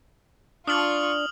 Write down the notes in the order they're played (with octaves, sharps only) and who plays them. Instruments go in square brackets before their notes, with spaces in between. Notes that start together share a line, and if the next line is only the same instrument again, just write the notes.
[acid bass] D4 [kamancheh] F4 C#6 [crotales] D#6 F6 F#7